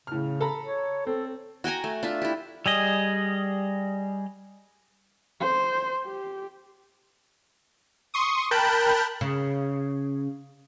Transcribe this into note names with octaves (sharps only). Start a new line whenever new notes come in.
A2 C#3 F6
A4 A#5 B5
C#5
C4 A4
F#4 G5 G#5 A#5
A3
D4 F4 E5
E4 G4
G3 G#4 D#5
C5
G4
C6 C#6 D#6
A#4 G5 A5 B5 F#6 G6
C#3